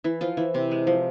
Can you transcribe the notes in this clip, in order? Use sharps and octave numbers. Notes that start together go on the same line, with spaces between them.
E3 E4
F3 F4
E3 E4
C3 C4
G#3
F3